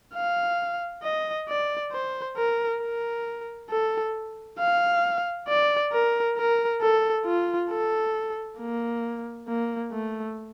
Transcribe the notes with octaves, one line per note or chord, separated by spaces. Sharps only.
F5
D#5
D5
C5
A#4
A#4
A4
F5
D5
A#4
A#4
A4
F4
A4
A#3
A#3
A3